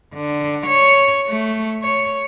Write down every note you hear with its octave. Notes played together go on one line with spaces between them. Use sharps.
D3
C#5
A3
C#5